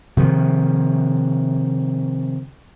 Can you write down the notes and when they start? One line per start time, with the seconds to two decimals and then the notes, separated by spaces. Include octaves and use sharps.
0.17 C3 D#3 F3